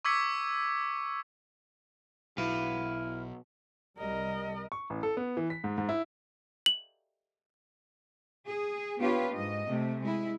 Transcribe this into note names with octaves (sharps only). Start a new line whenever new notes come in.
C#6 D6 E6 G#6 B6 C#7
B1 E4 B4 F5
C2 G3 A#4 D#5
C#6
A1
A4
B3
E3
B6
G#2
G#2
E4
F#7
G#4
B3 D4 F4 G4 B4 C#5
G#2 D#5
C3 A3
G#3 E4